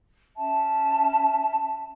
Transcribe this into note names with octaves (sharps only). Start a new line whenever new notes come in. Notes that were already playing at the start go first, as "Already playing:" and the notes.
C#4 E5 A5